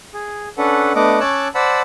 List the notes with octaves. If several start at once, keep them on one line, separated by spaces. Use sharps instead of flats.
G#4
C#4 D4 A4 B4 F#5
A3 B3 D4 D#5 F#5 D6
C#4 C#5 A5 D6 E6 F#6
C5 D5 F#5 A5 B5 E6